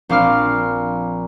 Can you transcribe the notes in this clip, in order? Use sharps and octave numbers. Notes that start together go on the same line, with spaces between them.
A#1 C4 F5 D6 F6